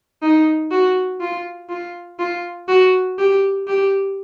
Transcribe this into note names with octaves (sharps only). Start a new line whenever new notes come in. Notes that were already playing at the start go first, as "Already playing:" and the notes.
D#4
F#4
F4
F4
F4
F#4
G4
G4